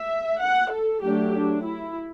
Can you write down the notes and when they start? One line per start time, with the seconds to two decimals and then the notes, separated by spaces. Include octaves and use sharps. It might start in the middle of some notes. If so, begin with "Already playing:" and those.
Already playing: E5
0.41 F#5
0.71 A4
1.02 F#3 A3 D4 G4
1.33 D4
1.64 E4